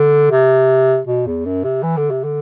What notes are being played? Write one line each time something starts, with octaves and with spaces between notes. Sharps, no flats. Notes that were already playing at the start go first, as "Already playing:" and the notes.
Already playing: D3
C3
B2
E2
F#2
C3
E3
D3
C3
D3